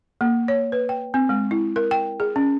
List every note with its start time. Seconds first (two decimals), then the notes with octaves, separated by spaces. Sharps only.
0.21 A#3
0.48 C#5
0.72 B4
0.89 G5
1.14 C4
1.29 G#3
1.51 E4
1.76 A#4
1.91 G5
2.20 G#4
2.36 C#4